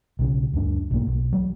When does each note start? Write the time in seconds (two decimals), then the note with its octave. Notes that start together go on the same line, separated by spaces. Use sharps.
0.19 B1 C#3
0.53 D2 G2 D4
0.91 B1 G#2 A#3
1.07 B1
1.33 F#3 G#3